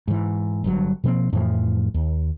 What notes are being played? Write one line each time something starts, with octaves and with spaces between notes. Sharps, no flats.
G#2 E3
G1 G2 F#3
B2 F3 A#3 C4
F2 A2 E3 F3
D#2